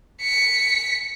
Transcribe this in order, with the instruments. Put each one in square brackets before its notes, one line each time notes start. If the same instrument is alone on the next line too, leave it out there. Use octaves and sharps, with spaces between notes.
[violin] B6 C#7